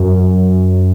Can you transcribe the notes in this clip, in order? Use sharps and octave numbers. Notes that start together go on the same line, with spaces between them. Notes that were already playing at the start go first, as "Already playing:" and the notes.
Already playing: F#2